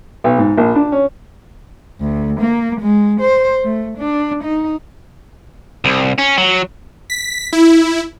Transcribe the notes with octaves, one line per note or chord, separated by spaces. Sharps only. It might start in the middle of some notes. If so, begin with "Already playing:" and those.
B1
G#2
A#1
D4
C#4
D2
A#3
G#3
C5
A3
D4
D#4
C2
C#4
F#3
B6
E4